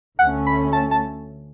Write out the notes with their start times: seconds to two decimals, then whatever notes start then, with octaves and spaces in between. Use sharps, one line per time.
0.19 D2 D3 A3 C#4 F#5
0.46 B5
0.73 A5
0.91 A5